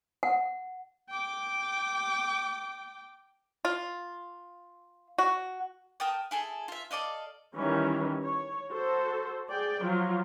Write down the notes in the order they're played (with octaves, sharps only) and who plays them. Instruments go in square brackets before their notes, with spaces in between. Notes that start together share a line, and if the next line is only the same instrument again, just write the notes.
[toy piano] F#5
[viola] G5 D6
[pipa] F4
F#4
[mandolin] A#4 G5 A5 D#6
E4 G#4 A4
F4 E5
A4 D5 D#5 F5
[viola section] D#3 E3 G3 C#4
C#5
F#4 A4 C5
G#4 D5 G5
F3 F#3 F4